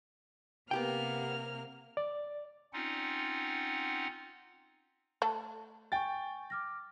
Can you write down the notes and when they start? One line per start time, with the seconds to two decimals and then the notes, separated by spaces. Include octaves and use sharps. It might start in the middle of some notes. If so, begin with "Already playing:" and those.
0.71 C3 A#3 B3 G4 G5 F6
1.97 D5
2.73 C4 C#4 D#4 F4 F#5
5.22 A3 A4
5.92 G5 G#5 C#6 A6
6.50 D6 F6 A#6